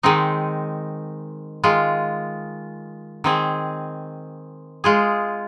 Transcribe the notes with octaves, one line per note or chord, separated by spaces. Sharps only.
D#3 G#3 C4 D#4
D#3 G#3 F4
D#3 C4 G#4
G#3 F4 G#4